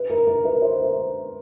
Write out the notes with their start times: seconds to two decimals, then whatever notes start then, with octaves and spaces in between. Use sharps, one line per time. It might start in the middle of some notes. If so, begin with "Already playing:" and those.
Already playing: B4
0.10 A#4
0.27 A#4
0.45 B4
0.62 C5
0.73 B4
0.84 C5